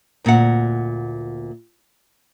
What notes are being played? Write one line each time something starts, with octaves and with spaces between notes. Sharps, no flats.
D2 A#2 C4 F#5